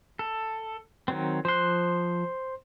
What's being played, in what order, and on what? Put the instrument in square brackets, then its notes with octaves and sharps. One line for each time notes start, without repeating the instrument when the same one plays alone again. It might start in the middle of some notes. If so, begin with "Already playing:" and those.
[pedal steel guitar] A4
D#3 F#3 C4
[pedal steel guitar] F3 F#6 [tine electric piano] C5 C6